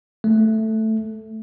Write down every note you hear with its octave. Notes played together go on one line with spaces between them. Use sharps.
A3